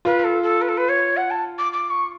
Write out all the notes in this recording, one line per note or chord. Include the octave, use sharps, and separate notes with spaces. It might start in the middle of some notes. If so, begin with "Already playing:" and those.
F4 B4
A4
A4
B4
A4
B4
C#5
F#5
A5
D6
D6
C#6